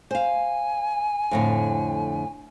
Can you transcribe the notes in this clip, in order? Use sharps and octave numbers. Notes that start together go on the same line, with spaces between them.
C5 F5 G#5
F2 A2 D3